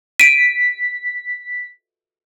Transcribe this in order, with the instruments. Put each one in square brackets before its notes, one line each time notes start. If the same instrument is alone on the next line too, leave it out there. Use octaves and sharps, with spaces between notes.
[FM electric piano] B6 [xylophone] D7 D#7